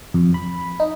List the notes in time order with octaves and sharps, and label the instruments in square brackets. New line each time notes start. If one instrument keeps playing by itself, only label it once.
[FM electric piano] F2
B5
D#4